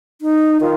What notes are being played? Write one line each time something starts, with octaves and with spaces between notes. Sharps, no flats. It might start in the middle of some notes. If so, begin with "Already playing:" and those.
D#4
D#3 F4